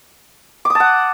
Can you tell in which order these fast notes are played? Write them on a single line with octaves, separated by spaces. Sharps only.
D6 D#6 A5 F#5